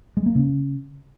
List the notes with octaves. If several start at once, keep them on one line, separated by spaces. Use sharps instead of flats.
G#3
A#3
C#3